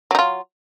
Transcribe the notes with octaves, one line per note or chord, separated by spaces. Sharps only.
F#3 D#4 F4